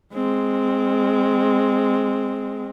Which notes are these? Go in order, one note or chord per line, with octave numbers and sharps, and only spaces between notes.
G#3 C4